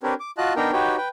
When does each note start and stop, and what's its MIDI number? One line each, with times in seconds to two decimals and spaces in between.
0.03 0.14 60
0.03 0.14 62
0.03 0.14 67
0.03 0.14 70
0.03 0.14 71
0.03 0.14 73
0.20 0.31 86
0.38 0.54 65
0.38 0.54 66
0.38 0.54 75
0.38 0.54 81
0.38 0.54 90
0.56 0.72 59
0.56 0.72 62
0.56 0.72 63
0.56 0.72 70
0.56 0.72 79
0.56 0.72 82
0.73 0.97 63
0.73 0.97 66
0.73 0.97 67
0.73 0.97 71
0.73 0.97 73
0.73 0.97 79
0.97 1.08 71
0.97 1.08 79